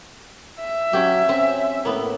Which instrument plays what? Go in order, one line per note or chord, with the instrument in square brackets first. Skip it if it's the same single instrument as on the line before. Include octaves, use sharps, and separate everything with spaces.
[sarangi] E5
[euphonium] F#3 [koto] C#4 G4
[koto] C4 [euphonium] C#4
[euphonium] A2 [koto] A#3 B3